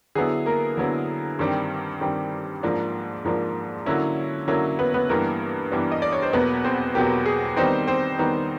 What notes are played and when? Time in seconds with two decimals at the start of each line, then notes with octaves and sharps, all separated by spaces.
0.15 D3 F#3 B3 E4 G#4
0.46 A#3 A#4
0.77 D3 F#3 B3 E4
1.39 G2 D#3 G3 C4
2.01 G2 D#3 G3 C4
2.63 G#2 F3 A#3 D4
3.24 G#2 F3 A#3 D4
3.86 D3 F#3 A#3 C#4 E4
4.48 D3 F#3 A#3 C#4 E4
4.79 B3 B4
4.94 B3 B4
5.09 G2 E3 G3 A#3 B3 A#4
5.72 G2 E3 G3 B3
5.92 D#5
6.02 D5
6.12 C#5
6.22 C5
6.33 E2 B2 F#3 A#3 B3 B4
6.64 C4 C5
6.94 E2 B2 F#3 A#3 G4
7.26 G#4
7.56 D#3 G3 B3 C4 D#4 C5
7.87 C4 C5
8.19 D#3 G3 B3 D#4